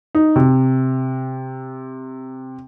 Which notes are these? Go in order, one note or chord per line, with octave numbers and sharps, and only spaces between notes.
D#4
C3